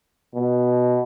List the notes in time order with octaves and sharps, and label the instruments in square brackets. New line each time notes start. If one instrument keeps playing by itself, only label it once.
[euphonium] B2